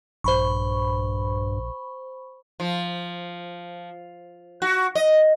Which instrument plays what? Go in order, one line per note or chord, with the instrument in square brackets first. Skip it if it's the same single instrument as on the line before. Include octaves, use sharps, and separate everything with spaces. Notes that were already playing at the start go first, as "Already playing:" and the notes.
[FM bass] A#1 [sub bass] G2 [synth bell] C5 B5 C#6
[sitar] F3
F#4
D#5